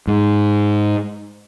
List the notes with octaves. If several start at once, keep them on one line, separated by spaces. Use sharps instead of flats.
G#2